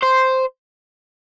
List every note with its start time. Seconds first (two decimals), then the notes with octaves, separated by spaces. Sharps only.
0.02 C5